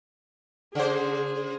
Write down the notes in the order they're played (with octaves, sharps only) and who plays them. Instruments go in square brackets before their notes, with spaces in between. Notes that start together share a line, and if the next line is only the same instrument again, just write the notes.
[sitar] C#3 C5 [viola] G#4